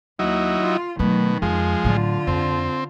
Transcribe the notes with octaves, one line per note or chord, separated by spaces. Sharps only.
D#2 F#3 D#4 E4
F4
B2 D#3 F#3 A3
F2 F3 G#3 B3
A2 D3 F#3 F4
F2 C4